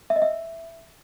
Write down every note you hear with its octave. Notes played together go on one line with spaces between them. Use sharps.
E5
D#5
E5